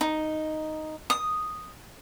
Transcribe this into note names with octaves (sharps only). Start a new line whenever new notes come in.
D#4
D#6